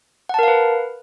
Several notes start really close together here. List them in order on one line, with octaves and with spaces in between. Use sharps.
F#5 A5 A#4 F5 B4